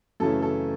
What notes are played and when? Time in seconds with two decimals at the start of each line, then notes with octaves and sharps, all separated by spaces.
0.20 F#2 C#3 E3 A3 A4
0.42 A4